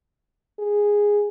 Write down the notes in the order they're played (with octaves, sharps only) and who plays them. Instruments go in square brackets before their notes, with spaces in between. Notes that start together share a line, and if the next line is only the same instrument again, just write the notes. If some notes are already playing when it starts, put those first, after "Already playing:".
[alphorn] G#4